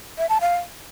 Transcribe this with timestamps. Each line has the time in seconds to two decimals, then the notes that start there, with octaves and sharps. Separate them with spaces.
0.18 E5
0.29 A5
0.41 F5